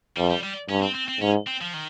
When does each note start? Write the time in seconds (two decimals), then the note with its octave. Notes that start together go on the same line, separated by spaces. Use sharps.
0.17 F2 G3
0.30 G3
0.43 G3
0.69 G2 C#4
0.82 C4
0.95 C4
1.08 C4
1.21 G#2 C#4
1.47 C4
1.61 F3
1.73 D#3